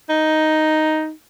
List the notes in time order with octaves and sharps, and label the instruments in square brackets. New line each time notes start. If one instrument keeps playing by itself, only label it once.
[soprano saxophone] D#4